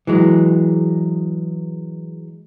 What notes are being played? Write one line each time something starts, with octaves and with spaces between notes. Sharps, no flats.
E3 F#3 G#3